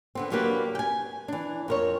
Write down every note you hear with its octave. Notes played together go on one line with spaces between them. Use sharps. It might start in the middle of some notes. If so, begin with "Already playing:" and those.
D3 B3 C4
F#3 A#3 D4 G4 B4
G5 G#5
E3 D4
F2 A#4 C#5